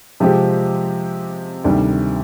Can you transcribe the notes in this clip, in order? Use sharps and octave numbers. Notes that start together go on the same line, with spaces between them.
C3 F3 G#3 C4 G4
D2 C3 D#3 G3